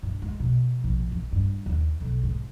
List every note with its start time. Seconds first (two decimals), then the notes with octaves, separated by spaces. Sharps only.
0.03 G2
0.22 G#3
0.40 B2
0.84 A#1
1.12 E3
1.32 G2
1.66 D#2
2.00 B1
2.23 G#2